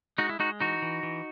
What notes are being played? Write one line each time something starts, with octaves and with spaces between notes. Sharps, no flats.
G#3 D#4 F#4
E4
G#3 D#4 F#4
E3 D#4 F#4
E3
E3